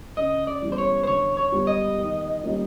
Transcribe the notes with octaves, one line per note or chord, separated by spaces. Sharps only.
C#3 D#5
D5
E3 G3 B3
C5
C#5
C5
D3 C#5
C#5
G3 B3
D#5
D#3
G3 A#3 C#4 F4